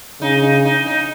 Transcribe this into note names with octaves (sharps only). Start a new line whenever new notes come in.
C#3 D#4
D#4
D#4
D#4